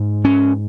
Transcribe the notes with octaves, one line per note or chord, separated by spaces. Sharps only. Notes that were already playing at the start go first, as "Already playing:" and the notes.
Already playing: G#2
C#4